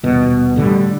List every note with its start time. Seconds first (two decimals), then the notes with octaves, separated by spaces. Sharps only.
0.03 D#1 B2
0.56 A2 D3 F3 G3